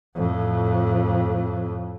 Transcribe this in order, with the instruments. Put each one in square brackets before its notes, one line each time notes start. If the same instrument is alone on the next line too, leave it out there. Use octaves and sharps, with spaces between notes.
[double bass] F2 A2